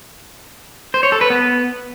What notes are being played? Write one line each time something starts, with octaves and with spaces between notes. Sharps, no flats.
C5
C#5
A4
B4
B3